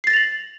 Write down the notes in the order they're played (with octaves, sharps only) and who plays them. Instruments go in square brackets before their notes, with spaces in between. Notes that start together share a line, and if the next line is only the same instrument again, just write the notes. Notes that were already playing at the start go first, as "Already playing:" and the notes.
[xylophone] C7
A6
A#6
F7
F#7